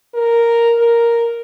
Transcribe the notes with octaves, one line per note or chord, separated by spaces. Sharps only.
A#4
A#4